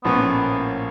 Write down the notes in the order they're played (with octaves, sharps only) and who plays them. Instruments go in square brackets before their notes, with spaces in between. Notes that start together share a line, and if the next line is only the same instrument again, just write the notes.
[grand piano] A#1 A2 F3 A#3 C#4 [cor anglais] B3